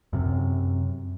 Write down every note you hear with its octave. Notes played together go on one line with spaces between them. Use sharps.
F#2 C3